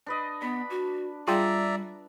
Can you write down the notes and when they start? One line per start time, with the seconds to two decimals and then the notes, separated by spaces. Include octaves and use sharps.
0.06 D4 B4 D#5
0.41 B3 D4 B5
0.70 F#4
1.28 G3 F4 G#4 D5 E5 G5 A#5